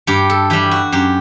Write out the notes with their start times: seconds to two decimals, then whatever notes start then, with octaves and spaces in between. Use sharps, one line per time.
0.07 G2 G4
0.30 A4
0.50 E3 G3 G4
0.71 F#4
0.92 F#2 G4